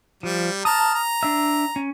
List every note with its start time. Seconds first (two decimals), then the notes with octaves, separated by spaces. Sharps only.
0.23 F3 G3
0.65 A5 A#5 D#6 F6
0.95 A#5
1.23 D4 E5
1.76 C#4